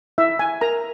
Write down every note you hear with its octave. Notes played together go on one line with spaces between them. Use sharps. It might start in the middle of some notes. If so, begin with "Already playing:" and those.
E4 E5
G#5
A#4 A#5